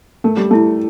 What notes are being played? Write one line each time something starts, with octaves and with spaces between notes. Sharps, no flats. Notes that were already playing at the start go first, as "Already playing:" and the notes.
A3 A#4
G3
A3 E4